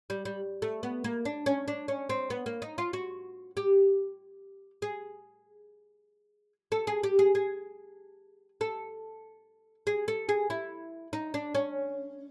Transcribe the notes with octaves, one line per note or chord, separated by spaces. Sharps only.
G3
G3
A3
B3
A#3
D4
C#4
D4
C#4
C4
B3
A#3
D#4
F4
F#4
G4
G#4
A4
G#4
G4
G#4
G#4
A4
G#4
A4
G#4
E4
D#4
D4
C#4